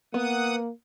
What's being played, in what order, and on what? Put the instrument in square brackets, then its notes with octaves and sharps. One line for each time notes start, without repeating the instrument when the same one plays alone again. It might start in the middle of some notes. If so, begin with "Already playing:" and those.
[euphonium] A#3 [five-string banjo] B3 [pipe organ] F#5 D#6